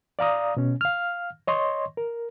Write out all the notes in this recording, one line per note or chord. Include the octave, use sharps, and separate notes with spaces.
D5 F5 A#5 D#6
B2 C#4
F5 F6
C#5 D#5 C6 C#6
A#4